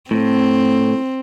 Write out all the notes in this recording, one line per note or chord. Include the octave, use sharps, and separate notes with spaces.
A2 C4